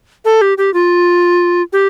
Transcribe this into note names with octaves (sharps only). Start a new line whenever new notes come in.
A4
G4
G4
F4
G4